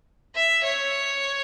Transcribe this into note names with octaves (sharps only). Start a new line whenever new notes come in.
E5
C#5